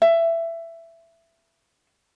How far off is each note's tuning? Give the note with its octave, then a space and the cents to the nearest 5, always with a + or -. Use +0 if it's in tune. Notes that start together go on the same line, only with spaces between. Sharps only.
E5 +15